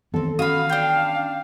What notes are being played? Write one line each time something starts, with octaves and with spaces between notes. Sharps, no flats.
D#3 E3 B3 C4 A4
C#4 F#4 F5 B5 D#6
D4 G5